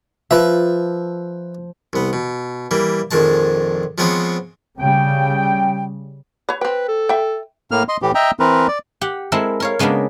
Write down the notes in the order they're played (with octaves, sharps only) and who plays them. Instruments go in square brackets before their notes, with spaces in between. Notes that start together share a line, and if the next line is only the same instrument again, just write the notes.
[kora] F3 [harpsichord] B4 E5
[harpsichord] C2 B3
B2
E3 G3 A#3
A#1 F2 D#3 G#3 A5
F3 G#3 B3 C4 C#5
[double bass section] C#3 G3 [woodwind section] G5
[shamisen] B4 C#5
[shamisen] C4 G5 [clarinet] B4
[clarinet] A4
[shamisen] E5 G5
[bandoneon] A2 A#3 F6
D#5 C6
A2 E3 G4
D#5 E5 G5 A#5
E3 C4 A#4 B4
D5
[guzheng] G4 F#5
G#3 C4 E4 A4 A#4
A#4 C#5 F5
C#3 G#3 A#3 B3 D4